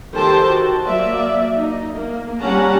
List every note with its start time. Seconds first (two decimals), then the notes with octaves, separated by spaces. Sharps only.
0.14 D#3 G4 A4 C5 G5 A5
0.47 F#4
0.84 F#3 A#3 D5 E5
1.55 D#4
1.94 A#3
2.40 G3 C#4 G4 F#5 A5 A#5